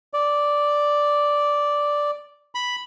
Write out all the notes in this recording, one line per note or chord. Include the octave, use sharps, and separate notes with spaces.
D5
B5